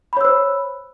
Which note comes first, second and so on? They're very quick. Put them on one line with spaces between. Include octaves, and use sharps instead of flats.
B5 C#5 E6 C5